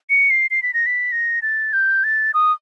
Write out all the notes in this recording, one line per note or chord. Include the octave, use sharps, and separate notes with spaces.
C#7
C7
C7
B6
A#6
B6
A#6
A6
G6
A6
D#6